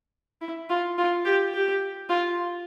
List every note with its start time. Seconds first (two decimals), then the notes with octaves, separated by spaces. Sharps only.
0.41 E4
0.70 F4
0.98 F4
1.25 G4
1.54 G4
2.09 F4